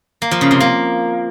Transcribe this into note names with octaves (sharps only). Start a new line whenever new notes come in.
A#3
F3
C#3
C3
A#3